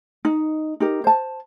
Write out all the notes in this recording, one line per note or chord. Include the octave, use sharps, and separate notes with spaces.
D#4
D#4 G4 A#4
C5 A5